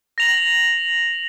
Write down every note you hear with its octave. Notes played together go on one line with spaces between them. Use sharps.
A#6 F7 F#7